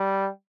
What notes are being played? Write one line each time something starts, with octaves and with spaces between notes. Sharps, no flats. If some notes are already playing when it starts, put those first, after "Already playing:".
Already playing: G3